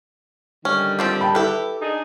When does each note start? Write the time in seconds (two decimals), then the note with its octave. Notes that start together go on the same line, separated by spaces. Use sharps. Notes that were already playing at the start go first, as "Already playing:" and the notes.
0.65 D3 D#3 G3 C#4
0.99 F3 C4 G4
1.21 G5 A5 B5
1.35 E4 G4 A4 B4
1.82 D4 D#4 G#4